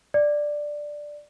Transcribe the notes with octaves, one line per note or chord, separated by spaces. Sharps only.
D5